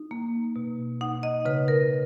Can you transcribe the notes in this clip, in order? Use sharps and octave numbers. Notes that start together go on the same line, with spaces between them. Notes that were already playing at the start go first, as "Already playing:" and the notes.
Already playing: D#4
A#3
B2
D#4 F#5
D#5
C#3 B4
A#4